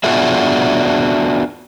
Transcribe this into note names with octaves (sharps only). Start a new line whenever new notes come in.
B3 D4 F4 F#4 G#4 E5